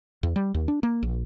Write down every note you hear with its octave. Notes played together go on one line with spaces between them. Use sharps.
E2
G3
D#2
D4
A#3
A#1